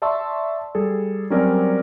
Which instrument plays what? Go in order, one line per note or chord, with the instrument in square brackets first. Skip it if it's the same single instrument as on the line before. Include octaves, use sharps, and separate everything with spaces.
[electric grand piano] D5 E5 A5 C6 C#6 E6
G3 G#4 A4
F#3 G3 C4 C#4 A#4 D5